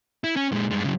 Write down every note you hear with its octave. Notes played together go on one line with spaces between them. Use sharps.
E4
C#4
A#2 G#3
G2 G#3
C#3 F#3